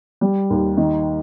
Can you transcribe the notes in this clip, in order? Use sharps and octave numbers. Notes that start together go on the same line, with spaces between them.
G3
D#2
D#3